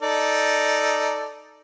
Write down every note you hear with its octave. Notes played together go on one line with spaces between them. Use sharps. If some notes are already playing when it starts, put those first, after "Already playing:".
D#4 A4 D5